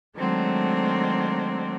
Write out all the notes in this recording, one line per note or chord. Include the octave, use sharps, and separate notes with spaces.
D#3 F#3 G#3 A3 C4 D4